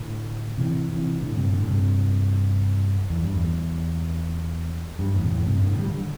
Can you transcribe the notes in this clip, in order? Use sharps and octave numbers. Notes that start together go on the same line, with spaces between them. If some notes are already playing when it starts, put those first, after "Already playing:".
Already playing: A2 D3
C3 E3
C3 E3
A2 D3
G2 C3
A2 D3
G2 C3
E2
G2
E2
G2
E2 A2
C3
E2 A2
G2 C3
A2 D3
D3 G3
D3 G3